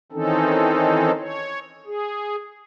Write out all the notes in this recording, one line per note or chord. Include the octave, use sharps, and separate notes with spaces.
D#3 E3 C4 C#4 D#4 A4
C#5
G#4